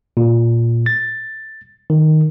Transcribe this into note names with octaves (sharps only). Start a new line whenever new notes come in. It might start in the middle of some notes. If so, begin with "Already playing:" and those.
A#2
A6
D#3